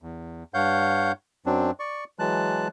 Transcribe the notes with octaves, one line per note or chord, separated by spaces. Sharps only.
E2
G2 C#5 F5 F#5 G6
F#2 F#3 C4 D4
D5 C#6
E3 F#3 G#3 A5 F#6